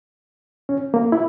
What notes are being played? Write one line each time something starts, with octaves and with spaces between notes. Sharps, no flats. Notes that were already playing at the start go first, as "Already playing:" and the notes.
C#4
A#3
E4